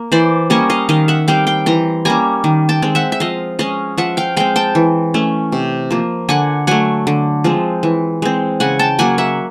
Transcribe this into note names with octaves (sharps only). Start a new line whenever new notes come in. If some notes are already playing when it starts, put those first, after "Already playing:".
Already playing: A#3
E3 C5 D5
G3 A#3 C#4 C#5 D#5
D#5 F5
D#3 D#5 F5
E5 F#5
G3 C4 F5 G5
F5 G5
E3 A#5 C6
G3 A#3 C#4 G#5 A#5
D#3
G5 A5
G#3 C4
E5 F#5
E5
F3 D#5 F5
G#3 C#4 D#5 F5
F3 E5 F#5
F5 G5
G#3 C4 F5 G5
G5 A5
E3
A3 C#4
C3
F3 A#3
D3 F#5 G#5
F#3 A3 F#5 G#5
D3
F3 G#3 C4
E3
G#3 C4
C#3 F#5 G#5
G5 A5
F#3 A#3 F#5 G#5
E5 F#5